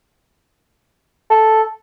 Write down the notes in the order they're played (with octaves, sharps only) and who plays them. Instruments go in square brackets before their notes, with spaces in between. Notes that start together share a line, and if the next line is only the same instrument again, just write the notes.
[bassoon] A4